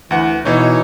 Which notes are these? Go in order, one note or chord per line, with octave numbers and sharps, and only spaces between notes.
D2 E3 F#5
B2 E3 D#4 C#5